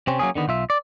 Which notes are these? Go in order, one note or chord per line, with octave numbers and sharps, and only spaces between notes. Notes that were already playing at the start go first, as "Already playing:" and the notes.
C3 C4 C#4
F#3 A#3 C#4 G#4
D3 D#3 B3
B1 F4 E5
D5